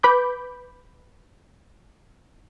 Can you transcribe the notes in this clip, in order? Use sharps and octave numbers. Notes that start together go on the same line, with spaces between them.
B4 B5 D6 G6